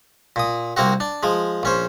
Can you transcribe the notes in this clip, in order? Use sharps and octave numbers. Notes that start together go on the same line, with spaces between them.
A#2 D#6
C2 A#3 C4 F#4
D4
F3 G#3
A#1 C#4 C5